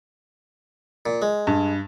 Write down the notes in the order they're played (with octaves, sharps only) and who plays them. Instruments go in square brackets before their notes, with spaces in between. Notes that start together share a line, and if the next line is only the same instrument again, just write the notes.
[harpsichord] A#2
G#3
[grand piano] G2